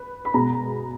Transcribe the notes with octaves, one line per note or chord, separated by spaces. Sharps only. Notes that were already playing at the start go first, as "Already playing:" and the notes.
Already playing: B4
B5
B2 G#3 B3 A#5